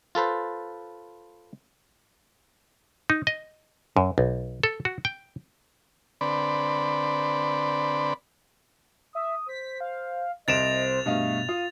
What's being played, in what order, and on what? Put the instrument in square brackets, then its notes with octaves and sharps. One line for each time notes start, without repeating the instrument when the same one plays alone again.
[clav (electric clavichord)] F4 A4 B4 C5
D#4
D#5
F#2
B1
A4
F#4
G5
[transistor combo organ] D3 C4 B4 D5 B5
[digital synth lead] E5 [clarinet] D#6
[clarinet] C5 [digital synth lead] B6
[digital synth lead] F5
[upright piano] C2 D7 E7 [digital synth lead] C5 [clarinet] D#5 [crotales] A6 F7
[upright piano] G2 D#5 F5 [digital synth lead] B2 [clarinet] A3
[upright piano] F4 [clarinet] F5 [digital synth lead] D#6